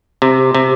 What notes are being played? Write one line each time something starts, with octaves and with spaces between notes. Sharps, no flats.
C3
C3